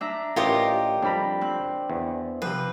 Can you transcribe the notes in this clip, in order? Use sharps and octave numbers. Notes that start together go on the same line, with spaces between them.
D4 E5 A#5
A1 F4 G4 A#4 C#5 D#5 A#5
F2 G3 D4 A#5 B5
C4 F#6
E2
C3 F3 B4